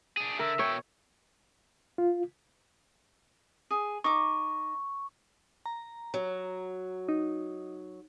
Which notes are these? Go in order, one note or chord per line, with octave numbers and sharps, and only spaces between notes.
D4 G#4
D3 A#4 E5
B2 C#5 G5
F4
G#4
D#4 C#6 D6
A#5
F#3
D#4